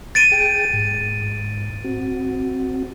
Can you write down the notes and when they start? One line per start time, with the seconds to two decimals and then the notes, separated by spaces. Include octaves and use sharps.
0.15 A6 D7 D#7
0.32 G#4 G5
0.73 G#2
1.85 C4 F#4